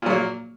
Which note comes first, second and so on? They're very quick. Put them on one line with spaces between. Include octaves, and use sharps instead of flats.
A#2 F#3 A#3